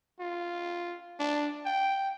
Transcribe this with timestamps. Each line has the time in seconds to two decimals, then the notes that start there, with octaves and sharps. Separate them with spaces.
0.20 F4
1.20 D4
1.65 G5